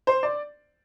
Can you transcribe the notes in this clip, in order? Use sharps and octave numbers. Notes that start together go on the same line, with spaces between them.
C5
D5